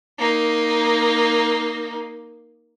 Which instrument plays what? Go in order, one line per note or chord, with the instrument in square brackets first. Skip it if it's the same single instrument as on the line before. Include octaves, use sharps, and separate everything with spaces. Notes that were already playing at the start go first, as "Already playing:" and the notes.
[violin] A#3 D#4